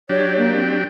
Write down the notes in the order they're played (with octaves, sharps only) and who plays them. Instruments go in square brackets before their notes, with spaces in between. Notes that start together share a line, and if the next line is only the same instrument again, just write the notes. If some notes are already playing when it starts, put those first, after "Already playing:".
[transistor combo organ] F#3 D4 G4 [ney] C#5
[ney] A#3
C4